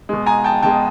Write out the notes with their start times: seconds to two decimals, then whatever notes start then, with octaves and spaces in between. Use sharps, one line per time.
0.09 B2 G#3
0.26 G#5 A#5
0.44 G5 A5
0.62 B2 G#3 G5 A5